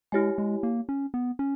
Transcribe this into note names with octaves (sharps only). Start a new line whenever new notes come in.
G#3 E4 G4 C#5 G#5
G#3
A#3
C#4
B3
C#4